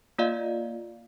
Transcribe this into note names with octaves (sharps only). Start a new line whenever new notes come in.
A#3 F4 D5 D#5 F5